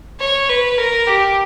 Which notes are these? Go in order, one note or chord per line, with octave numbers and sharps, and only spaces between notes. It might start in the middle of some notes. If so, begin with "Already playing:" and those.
C#5
B4
A#4
G4